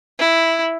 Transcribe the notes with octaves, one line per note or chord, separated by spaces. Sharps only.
E4